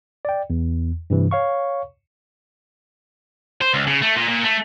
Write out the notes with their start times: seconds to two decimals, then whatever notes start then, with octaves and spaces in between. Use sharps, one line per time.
0.25 D5 G5
0.50 E2
1.10 G2 C3 E3
1.31 C#5 F5 C#6
3.61 C5
3.74 C#2
3.87 C#3
4.02 A3
4.16 A#2
4.28 A#2
4.44 A3